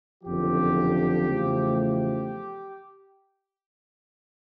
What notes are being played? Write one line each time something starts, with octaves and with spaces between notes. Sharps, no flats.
F#1 F2 D3 F3 G4
E2 C#3 F3 A3
G4